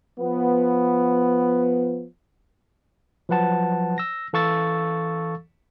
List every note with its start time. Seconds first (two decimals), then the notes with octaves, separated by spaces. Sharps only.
0.19 F3 B3
3.29 F3 F#3 B4 F#5 A5
3.98 E6 A#6
4.33 E3 A4 F5 C#6 E6 A6